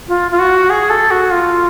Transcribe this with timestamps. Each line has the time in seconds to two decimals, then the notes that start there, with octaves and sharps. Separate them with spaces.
0.08 F4
0.31 F4
0.39 F#4
0.70 G#4
0.90 A4
1.11 F#4
1.31 F4